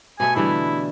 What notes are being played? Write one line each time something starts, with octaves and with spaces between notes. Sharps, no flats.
B2 A3 E5 G#5
D3 E3 G3 E4